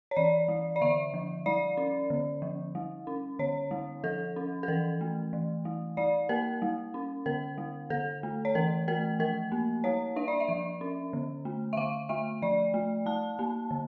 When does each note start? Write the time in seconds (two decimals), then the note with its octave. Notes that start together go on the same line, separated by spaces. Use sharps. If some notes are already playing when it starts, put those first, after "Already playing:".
0.11 C#5
0.16 E3 D5
0.48 G3
0.76 D5
0.81 D3 E5
1.14 F3
1.46 G3 D5
1.77 C#4
2.10 D3
2.42 F3
2.75 G3
3.07 C#4
3.39 D3 C#5
3.71 G3
4.04 F3 A4
4.36 C#4
4.63 A4
4.68 E3 A#4
5.01 A3
5.33 E3
5.65 G3
5.97 G3 D5
6.29 A#3 A#4
6.62 G3
6.94 C#4
7.26 D3 A#4
7.58 G3
7.90 D3 A4
8.23 A3
8.45 C#5
8.55 E3 A#4
8.88 A3 A#4
9.19 F3 A#4
9.52 A#3
9.84 G3 C#5
10.16 D4 E5
10.28 D5
10.40 E5
10.48 F3
10.81 C#4
11.13 D3
11.45 A3
11.73 E5
11.77 D3 F5
12.09 A3 E5
12.42 F3 D5
12.74 A3
13.06 G3 A5
13.39 A#3
13.71 D3